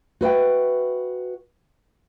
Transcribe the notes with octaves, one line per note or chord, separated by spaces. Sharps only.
F#4 B4 E5 G5